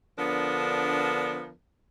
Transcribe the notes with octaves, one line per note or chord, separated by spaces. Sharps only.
D3 F3 B3 D4 A#4